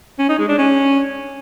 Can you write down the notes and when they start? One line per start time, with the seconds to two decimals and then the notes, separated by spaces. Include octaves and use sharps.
0.19 C#4
0.29 D#4
0.39 G#3
0.49 D4
0.58 C#4